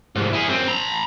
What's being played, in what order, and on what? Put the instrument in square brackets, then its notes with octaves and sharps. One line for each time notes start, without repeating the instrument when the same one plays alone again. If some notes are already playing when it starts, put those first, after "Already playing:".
[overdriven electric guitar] C2 G#2
E4 G#4
F#2 C4
A#5 B5